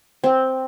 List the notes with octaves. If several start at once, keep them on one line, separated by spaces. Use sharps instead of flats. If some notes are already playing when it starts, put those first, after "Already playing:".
C4